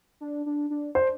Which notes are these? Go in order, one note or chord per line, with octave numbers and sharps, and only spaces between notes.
D4
D4
D4
D4 C5